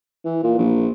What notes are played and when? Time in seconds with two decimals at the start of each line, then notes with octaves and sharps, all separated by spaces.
0.25 E3
0.43 A#2
0.59 A#1